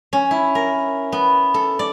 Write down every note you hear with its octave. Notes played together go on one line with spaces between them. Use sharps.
C#4
E4
A#4
B3
A4
D5